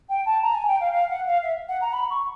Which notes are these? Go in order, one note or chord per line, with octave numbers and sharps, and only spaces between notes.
G5
A5
A#5
G#5
G5
F5
F5
F#5
F5
E5
F#5
A#5
B5
C#6